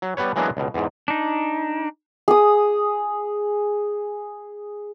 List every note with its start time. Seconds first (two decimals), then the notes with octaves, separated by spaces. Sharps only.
0.02 F#3
0.17 G3 B3 B4 C#5
0.36 E3 F#3 G#3 A#3 B3 D4
0.57 C#2 B2
0.74 E2 G#2
1.08 D4 D#4
2.28 G#4 D#6